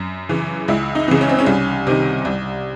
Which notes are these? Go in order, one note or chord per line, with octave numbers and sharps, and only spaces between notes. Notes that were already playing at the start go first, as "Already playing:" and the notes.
Already playing: F#2
C#3 E3
C#2 E4
D#4
C#3 E3
C#4
C4
C#4
C2
C3 D#3
C2